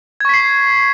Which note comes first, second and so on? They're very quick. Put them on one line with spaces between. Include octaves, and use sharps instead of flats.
G#6 C#6 B6 C7